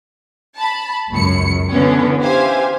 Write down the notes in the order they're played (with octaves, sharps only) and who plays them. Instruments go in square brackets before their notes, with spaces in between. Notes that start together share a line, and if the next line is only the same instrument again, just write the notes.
[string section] A5 B5
C#2 F#2 C#7
D3 E3 B3 C#4
G4 C5 E5 F5 G#5